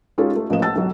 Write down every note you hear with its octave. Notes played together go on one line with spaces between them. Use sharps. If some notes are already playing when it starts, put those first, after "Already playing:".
G#3 C#4 D#4 F4 G4 A4
A3
A1 F3 A#3 D#5 E7
F#5 A5 E6 A6
B1 F#3